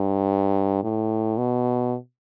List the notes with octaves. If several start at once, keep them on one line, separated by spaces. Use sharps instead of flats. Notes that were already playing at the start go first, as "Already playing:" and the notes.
Already playing: G2
A2
B2